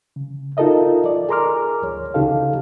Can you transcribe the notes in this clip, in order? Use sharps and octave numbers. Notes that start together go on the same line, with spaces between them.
C#3
D#4 F4 A4 A#4 D#5 E5
D5
G#4 A#4 A#5 C6 D6 F6
D2 C#5
C#2 C#3 D#4 G4 A4 F5